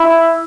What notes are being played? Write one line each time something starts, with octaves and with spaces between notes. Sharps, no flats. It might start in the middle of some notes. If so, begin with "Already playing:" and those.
Already playing: E4